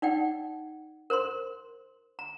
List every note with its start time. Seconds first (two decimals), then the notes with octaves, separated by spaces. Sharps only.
0.02 D#4 D5 F#5 G5
1.10 A#4 C5 A#5 C6
2.19 A#5